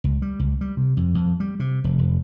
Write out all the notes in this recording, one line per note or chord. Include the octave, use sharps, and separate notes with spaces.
C#2
G3
C#2
G3
C3
F2
F2
G3
C3
F1
F1